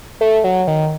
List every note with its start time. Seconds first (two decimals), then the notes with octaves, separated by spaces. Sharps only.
0.21 A3
0.44 F#3
0.67 D#3